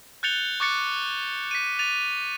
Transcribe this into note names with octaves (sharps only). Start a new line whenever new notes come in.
F#6 G6 A6 C#7 F7 G7
C#6 D6 F#6 A6 C#7
B6 D#7
A6 D#7 F7